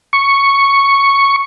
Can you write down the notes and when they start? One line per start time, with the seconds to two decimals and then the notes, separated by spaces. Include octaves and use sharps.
0.13 C#6